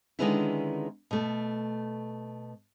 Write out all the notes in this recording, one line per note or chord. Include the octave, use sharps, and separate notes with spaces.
D3 D#3 G#3 B3 C#4 E4
B2 A3